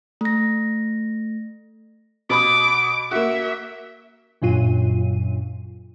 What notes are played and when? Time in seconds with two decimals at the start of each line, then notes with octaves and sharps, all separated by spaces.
0.21 A3 A#6
2.30 B2 B5 D6 D#6
3.11 A#3 F#4 E5
4.42 G1 F#2 A#2 F#3 F4 D#7